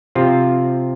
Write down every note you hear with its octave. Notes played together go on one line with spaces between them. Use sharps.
C3 F3 C4 F4